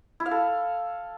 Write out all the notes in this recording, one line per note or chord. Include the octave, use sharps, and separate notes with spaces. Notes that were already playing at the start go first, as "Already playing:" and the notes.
E4
F5
A4